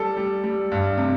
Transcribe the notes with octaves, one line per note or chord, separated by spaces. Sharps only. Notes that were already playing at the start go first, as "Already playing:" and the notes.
Already playing: G3 A4
G3
G3
G2
C3